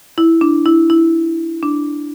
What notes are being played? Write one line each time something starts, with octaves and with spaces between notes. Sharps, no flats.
E4
D4
E4
E4
D4